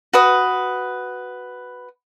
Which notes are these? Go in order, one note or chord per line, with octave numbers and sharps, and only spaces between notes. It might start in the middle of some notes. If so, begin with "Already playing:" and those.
F#4 B4 D#6